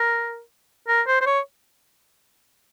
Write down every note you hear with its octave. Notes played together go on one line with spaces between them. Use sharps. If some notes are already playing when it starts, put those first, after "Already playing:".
Already playing: A#4
A#4
C5
C5
C#5